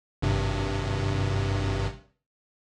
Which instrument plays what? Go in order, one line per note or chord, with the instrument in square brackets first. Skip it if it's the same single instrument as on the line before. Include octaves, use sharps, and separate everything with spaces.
[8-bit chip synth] G#1 G2 C3